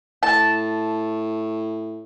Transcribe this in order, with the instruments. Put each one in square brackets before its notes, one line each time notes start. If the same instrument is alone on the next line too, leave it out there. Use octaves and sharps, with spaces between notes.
[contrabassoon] A2 [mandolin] A5